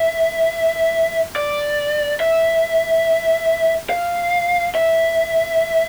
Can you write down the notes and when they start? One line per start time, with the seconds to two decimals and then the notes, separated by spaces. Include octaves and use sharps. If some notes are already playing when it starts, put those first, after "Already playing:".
Already playing: E5
1.36 D5
2.20 E5
3.90 F5
4.75 E5